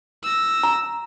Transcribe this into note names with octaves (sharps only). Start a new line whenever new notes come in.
E6 A#6
A#5